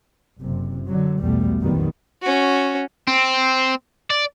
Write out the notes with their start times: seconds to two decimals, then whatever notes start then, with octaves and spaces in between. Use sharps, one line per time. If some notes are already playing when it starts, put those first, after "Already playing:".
0.41 F#1 C3
0.88 D3 F#3
1.19 B1 E2 B2 G3 A3
1.60 A#1 F2 D#3 F#3 G3 B3
2.22 C#4 F#4
3.07 C4
4.10 D5